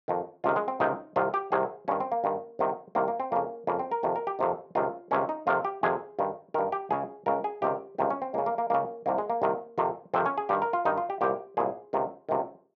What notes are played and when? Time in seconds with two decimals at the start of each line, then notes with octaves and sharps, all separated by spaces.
0.08 F2 D#3
0.44 C#2 C3 D#3 F4
0.56 G#3
0.68 C4
0.80 C#2 C3 D#3 D#4
1.16 C2 C3 D#3 F4
1.34 G4
1.52 C2 C3 D#3 G#4
1.88 G2 D#3 C#4
2.00 C4
2.12 A#3
2.24 G2 D#3
2.59 C2 C3 D#3
2.95 C2 C3 D#3 A#3
3.08 A#3
3.20 C4
3.32 F2 C#3 A#3
3.67 F2 C#3 A#3
3.79 C4
3.92 A#4
4.03 F2 C3 D#3
4.16 A#4
4.27 G4
4.39 F2 C3 D#3
4.75 C#2 C3 D#3 F4
5.11 C#2 C3 D#3 C#4
5.29 D#4
5.47 F2 C3 D#3 F4
5.65 G4
5.83 F2 C3 D#3 G#4
6.19 G2 D#3
6.54 G2 D#3 A#4
6.72 G4
6.91 C#2 C#3 G#4
7.26 C#2 C#3 A#4
7.44 G#4
7.62 C#2 C3 D#3 G4
7.98 C#2 C3 D#3
8.10 C#4
8.22 C4
8.34 C#2 A#3
8.38 C#3
8.46 A#3
8.58 A#3
8.70 C#2 C#3 A#3
9.06 C2 C3 D#3 A#3
9.18 G#3
9.30 A#3
9.42 C2 C3 D#3
9.78 F2 C3 D#3
10.14 F2 C3 D#3 C4
10.26 C#4
10.38 G#4
10.49 G2 D#3 G4
10.62 A#4
10.73 F4
10.85 G2 D#3 D#4
10.98 F4
11.10 G4
11.21 C2 A#2 G4
11.57 C2 A#2 G#4
11.93 C#2 C3 D#3
12.29 C#2 C3 D#3